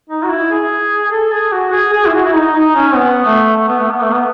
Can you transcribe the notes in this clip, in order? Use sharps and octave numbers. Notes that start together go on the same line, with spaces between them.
D#4
F#4
E4
G#4
A4
G#4
F#4
G#4
G#4
E4
F#4
E4
D#4
D#4
C#4
B3
A3
A3
B3
A3
B3
A3
B3